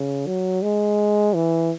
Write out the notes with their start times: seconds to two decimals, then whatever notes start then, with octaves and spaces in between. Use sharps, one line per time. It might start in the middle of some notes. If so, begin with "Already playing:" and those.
Already playing: C#3
0.27 F#3
0.62 G#3
1.34 E3